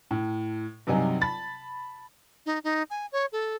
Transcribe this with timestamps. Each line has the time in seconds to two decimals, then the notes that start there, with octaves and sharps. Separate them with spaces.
0.11 A2
0.87 G2 C3 F#3 D#4 G#5
1.21 A5 B5 A6
2.46 D#4
2.64 D#4
2.90 G#5
3.12 C#5
3.32 A4